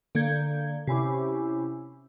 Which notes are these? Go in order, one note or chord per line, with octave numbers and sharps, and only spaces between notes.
D3 A#3 G6 G#6
C3 C#4 E4 G4